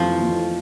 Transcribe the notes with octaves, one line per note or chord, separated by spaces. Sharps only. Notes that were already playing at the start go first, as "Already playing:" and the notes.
Already playing: F2 C3 E3 F3 A3
F2